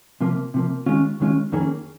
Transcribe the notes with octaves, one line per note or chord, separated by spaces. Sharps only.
C3 F3 A#3
C3 F3 A#3
D#2 D#3 G#3 C#4 F4
D#2 D#3 G#3 C#4 F4
F2 D#3 A#3 C#4 G#4